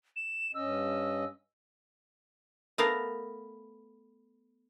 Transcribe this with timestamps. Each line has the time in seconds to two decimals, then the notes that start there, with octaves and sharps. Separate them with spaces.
0.16 E7
0.55 G2 C#4 D#5 E6
2.78 A3 B3 A#4 F5